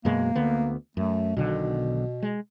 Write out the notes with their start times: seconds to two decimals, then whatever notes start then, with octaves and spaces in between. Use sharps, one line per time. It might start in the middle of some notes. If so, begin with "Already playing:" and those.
0.05 F#2 B2 G#3 A#3
0.35 D2 D3 B3
0.97 F#2 A3
1.37 B1 B2 D3 D#3
2.23 G#3